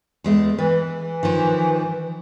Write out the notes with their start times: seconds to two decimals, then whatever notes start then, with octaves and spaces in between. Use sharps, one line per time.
0.24 E2 G#3 A3
0.58 E3 B4
1.23 D#3 F3